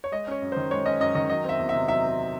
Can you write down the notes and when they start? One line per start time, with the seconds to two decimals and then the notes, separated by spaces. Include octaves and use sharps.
0.04 C#5
0.12 G#3 D#5
0.27 C#4 C#5
0.42 F#2
0.52 D#3 C5
0.71 G#3 C#5
0.86 C#4 D#5
1.00 F#2 D#5
1.15 D#3 D#5
1.30 F#3 D#5
1.44 C4 E5
1.59 E2
1.69 C3 E5
1.88 F#3 E5
2.03 C4